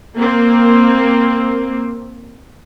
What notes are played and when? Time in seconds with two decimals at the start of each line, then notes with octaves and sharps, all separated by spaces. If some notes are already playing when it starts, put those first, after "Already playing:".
0.17 A#3 C4